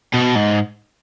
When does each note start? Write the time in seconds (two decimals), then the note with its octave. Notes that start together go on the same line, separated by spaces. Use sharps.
0.14 B2
0.35 G#2